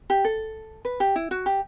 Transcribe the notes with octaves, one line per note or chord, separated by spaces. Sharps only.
G4
A4
B4
G4
E4
F#4
G4